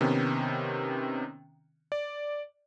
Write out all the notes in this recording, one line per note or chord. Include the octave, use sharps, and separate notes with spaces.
C3 D#3 B3 C#4
D5